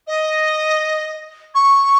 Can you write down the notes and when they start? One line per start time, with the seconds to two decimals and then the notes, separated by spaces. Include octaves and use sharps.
0.07 D#5
1.54 C#6